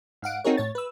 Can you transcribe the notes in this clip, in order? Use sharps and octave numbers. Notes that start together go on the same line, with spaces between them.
G#2 F5 F#5 D7
C4 D#4 F#4 G#4 A#4 C#5
A2 C#5 A6
B4 E6